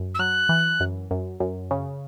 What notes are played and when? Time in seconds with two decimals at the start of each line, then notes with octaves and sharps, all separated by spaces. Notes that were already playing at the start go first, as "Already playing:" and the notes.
Already playing: F#2
0.15 E6
0.19 F#3 F#6
0.49 E3
0.80 F#2
1.11 F#2
1.40 F#2
1.71 C#3